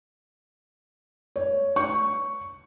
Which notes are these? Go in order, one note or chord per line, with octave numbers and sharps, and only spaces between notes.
C#5
C#6